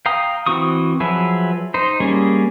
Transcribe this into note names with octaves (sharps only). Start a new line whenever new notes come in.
F5 G5 A#5 D#6
E3 C4 F#4 C#6 D#6
F3 F#3 G#4 B4 E5
D#4 C5
G3 A#3 C#4 G#4